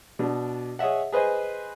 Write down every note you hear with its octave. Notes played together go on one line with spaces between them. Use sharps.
B2 D4
G#4 C#5 D#5 E5 F#5
G#4 B4 C5 D#5 G#5